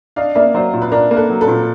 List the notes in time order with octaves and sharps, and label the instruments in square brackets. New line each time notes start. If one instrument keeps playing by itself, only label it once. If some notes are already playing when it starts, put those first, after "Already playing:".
[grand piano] D4 [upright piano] D#5 F5
[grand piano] A#3 [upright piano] D5 E5
[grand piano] F#3 [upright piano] C5 D5
[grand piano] A#2
[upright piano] B4
[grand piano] D4 [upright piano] A#4
[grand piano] A#3
[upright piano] A4 B4
[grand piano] F#3
[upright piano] A4 B4
[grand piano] A#2